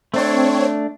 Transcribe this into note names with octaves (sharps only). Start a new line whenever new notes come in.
A3 C4 D4 C#5